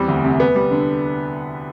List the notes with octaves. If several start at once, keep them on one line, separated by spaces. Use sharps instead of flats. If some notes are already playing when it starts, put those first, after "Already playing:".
Already playing: E2 G3 C4
D2
C3
B3
G3
D3